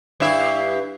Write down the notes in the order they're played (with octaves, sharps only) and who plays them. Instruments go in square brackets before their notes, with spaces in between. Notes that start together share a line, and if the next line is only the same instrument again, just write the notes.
[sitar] G2 E4 E5